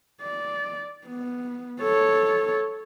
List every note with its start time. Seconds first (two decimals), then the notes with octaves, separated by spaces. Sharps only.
0.22 D5
1.07 B3
1.81 A4 C#5